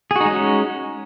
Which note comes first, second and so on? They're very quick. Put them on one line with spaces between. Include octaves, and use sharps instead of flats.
G#4 F#4 D#4 G#3 C#4